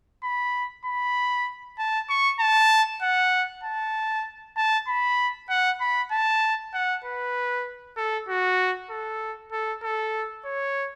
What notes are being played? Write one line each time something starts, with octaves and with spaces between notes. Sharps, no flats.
B5
B5
A5
C#6
A5
F#5
A5
A5
B5
F#5
B5
A5
F#5
B4
A4
F#4
A4
A4
A4
C#5